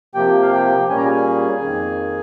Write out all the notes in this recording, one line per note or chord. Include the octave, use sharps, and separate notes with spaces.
C3 F3 A#3 G4 G5
F5
G4 G5
A#2 G3 A#3 C#4 G#5
A#5
G#4 G#5
F2 D#3 A#3